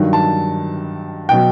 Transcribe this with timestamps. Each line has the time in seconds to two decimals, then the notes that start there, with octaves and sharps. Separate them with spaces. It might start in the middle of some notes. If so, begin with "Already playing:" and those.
Already playing: G2 D#3 F#3
0.13 A5
1.29 B2 F#3 G5